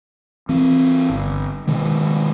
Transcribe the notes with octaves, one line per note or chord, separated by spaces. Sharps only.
E3 C4
G1
B2 D#3 G#3